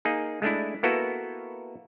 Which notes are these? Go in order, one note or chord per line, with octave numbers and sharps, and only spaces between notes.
A#3 D#4 G#4
G#3 A3 D4 E4
A#3 B3 E4 F#4 A4 B4